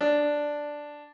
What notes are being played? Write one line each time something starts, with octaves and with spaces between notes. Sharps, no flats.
D4